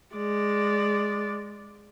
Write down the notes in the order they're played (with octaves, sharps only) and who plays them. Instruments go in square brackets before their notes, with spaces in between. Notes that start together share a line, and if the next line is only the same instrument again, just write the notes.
[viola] G#3 D5